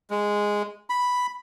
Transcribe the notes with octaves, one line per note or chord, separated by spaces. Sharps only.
G#3
B5